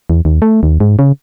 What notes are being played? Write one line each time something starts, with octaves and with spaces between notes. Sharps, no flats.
E2
D#2
A3
D#2
G#2
C#3